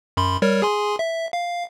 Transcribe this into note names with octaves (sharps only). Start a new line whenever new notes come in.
F#2 B5 C6
G3 A#4 C#5
G#4 G#5 C6
E5
F5